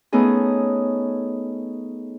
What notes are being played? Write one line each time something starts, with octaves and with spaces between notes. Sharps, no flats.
A3 B3 C#4 D#4 G#4